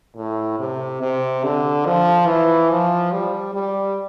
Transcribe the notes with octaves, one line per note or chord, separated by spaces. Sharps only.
A2
C3
C3
D3
F3
E3
F3
G3
G3